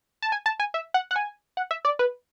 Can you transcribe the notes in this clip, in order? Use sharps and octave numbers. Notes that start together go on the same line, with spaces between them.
A5
G#5
A5
G#5
E5
F#5
F#5
G#5
F#5
E5
D5
B4